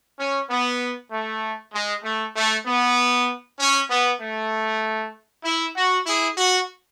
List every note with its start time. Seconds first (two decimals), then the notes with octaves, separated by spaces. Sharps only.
0.19 C#4
0.50 B3
1.12 A3
1.74 G#3
2.05 A3
2.36 A3
2.66 B3
3.59 C#4
3.90 B3
4.21 A3
5.45 E4
5.77 F#4
6.06 E4 G#4
6.37 F#4